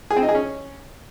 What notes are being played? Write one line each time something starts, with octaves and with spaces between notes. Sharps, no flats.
G#4
C4
D#4
G#4
C#4